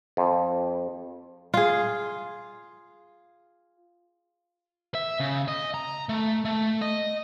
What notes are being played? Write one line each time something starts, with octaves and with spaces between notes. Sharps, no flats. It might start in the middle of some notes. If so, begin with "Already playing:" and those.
F2
F4 G#4
E5
C#3
D#5
A#5
A3
A3
D#5